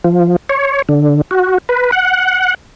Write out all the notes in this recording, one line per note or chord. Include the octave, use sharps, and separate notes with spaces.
F3
C#5
D3
F#4
B4
F#5